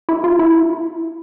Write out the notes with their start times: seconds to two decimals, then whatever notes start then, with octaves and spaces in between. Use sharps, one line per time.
0.09 E4
0.24 F4
0.39 E4